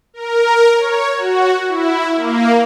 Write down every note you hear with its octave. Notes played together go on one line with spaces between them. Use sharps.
A#4
C#5
F#4
E4
A#3